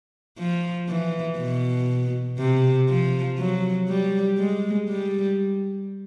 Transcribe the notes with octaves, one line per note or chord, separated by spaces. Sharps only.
F3
E3
B2
C3
F3
F#3
G3
G#3
G3